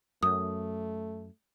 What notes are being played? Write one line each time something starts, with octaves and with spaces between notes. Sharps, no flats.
F#2 A3 D#6